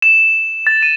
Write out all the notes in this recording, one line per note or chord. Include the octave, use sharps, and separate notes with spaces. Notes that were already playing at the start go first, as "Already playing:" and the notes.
E7
A6
D#7